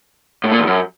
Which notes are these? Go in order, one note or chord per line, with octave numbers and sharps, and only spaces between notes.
A2
A#2
E2
F#2